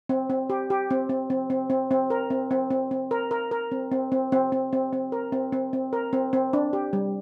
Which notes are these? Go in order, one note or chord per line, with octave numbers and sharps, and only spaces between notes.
C4
C4
G4
G4
C4
C4
C4
C4
C4
C4
A#4
C4
C4
C4
C4
A#4
A#4
A#4
C4
C4
C4
C4
C4
C4
C4
A#4
C4
C4
C4
A#4
C4
C4
D4
G4
G3